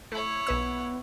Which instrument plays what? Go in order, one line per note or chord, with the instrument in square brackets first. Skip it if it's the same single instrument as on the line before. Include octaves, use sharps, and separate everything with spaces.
[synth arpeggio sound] A3 [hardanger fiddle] E4 C#5
[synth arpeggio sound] B1 B4 E6 [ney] B3